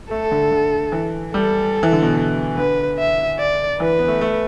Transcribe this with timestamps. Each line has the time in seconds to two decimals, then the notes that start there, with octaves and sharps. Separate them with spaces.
0.11 A3 A4
0.31 D3
0.52 D3
0.92 E3
1.34 G3 A4
1.83 E3
1.92 D3
2.02 B2
2.57 D3 B4
2.98 E5
3.39 D5
3.80 E3 B4
3.99 B3
4.08 A3
4.21 A3